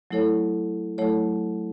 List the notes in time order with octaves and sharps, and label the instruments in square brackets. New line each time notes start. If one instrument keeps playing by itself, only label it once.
[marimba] F#3 A3 E4 A4 C#5
F#3 A3 E4 A4 C#5